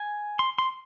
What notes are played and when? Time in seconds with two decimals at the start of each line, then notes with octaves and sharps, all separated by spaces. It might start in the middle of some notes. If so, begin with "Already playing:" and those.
Already playing: G#5
0.39 C6
0.58 C6